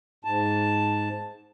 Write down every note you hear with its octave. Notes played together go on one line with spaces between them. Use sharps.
G#2 A5